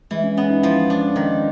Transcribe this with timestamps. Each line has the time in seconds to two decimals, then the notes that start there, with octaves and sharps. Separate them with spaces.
0.11 E3 G#3
0.24 C#4
0.37 B3 C#4
0.50 D#4
0.63 F3 E4
0.90 D4
1.16 D#3